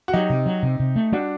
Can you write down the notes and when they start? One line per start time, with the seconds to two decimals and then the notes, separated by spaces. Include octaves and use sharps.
0.08 F#4
0.13 F#3 D#4 G4
0.30 C3
0.46 F#3
0.63 C3
0.80 C3
0.96 A3
1.12 G3 D4 F#4